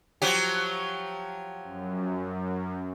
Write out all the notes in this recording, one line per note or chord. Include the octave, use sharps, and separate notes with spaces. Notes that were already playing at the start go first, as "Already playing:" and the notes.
F3 F#3 G4
F#2